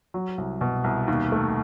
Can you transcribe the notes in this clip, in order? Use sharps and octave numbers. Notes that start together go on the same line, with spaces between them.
F#3
C2
B2
C2
D#2
A3